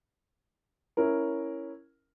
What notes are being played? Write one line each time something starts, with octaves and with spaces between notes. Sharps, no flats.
C#4 E4 A#4